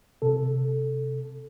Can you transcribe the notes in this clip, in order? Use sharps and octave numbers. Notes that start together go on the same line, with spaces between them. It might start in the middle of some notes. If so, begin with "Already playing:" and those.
C3 A4